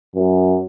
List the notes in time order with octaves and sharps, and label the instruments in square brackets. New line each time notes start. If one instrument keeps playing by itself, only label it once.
[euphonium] F#2